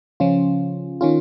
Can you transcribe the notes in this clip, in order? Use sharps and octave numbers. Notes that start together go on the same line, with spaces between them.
C#3 F3 C#4 F4
D#3 C#4 F4